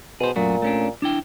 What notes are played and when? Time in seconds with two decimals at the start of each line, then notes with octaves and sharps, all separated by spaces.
0.20 B2 G#4 C5
0.36 F#2 A#2 A3 F#4
0.62 A3 C#4 D4
1.02 D4 E4 G5